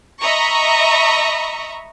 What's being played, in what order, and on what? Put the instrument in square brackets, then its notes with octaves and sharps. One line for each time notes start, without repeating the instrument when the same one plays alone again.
[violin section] D#5 E5 A#5 B5 C#6